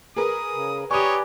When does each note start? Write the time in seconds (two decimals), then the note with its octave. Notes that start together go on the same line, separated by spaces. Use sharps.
0.16 G#4 A#4 B4 D#6
0.54 C#3
0.91 G4 B4 C#5 D5 G#5 A#5 C#6 D#6